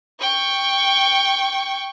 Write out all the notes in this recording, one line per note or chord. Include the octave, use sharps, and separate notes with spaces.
G5 C#6